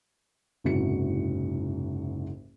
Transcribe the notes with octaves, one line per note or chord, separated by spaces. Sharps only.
F#1 C2 G#2 F#4 C#7